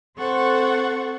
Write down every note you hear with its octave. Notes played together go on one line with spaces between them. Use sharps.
C4 A4 C5 F#5 C#6